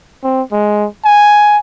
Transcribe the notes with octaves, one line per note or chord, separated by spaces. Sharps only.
C4
G#3
G#5